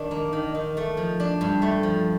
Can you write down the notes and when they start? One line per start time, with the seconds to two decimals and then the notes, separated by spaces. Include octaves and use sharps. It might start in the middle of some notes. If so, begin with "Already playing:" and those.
Already playing: D#3 D4
0.11 A#3
0.33 D#3
0.55 D#3
0.77 A3
0.97 F3
1.20 D4
1.41 G2
1.62 A3
1.83 F3